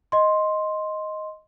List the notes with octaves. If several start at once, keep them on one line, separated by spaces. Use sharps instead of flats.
D#5 C6